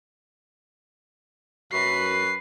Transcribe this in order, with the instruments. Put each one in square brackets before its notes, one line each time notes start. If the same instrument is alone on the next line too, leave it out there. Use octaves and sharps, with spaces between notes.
[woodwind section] F#2 F#4 B4 [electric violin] C7